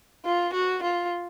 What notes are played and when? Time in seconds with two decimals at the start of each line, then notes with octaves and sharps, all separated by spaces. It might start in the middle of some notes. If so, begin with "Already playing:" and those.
0.25 F4
0.53 F#4
0.83 F4